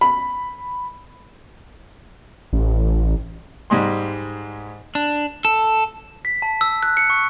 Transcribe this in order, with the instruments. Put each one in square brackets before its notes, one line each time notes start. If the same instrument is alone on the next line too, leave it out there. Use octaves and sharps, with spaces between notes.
[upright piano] B5
[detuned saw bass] A1
[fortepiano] G#2 G3 G#3 C6
[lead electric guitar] D4
A4
[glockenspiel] B6
A5
E6
F#6
C#7
C#6